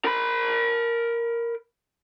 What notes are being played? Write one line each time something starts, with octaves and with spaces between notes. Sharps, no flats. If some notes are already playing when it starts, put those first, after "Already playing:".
A#4 B5